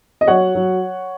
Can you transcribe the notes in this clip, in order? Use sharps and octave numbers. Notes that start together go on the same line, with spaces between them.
D#5
F#3 C#5 F#5
F#3